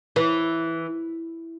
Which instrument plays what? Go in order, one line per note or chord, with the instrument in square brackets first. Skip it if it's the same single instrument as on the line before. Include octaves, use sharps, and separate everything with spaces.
[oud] E3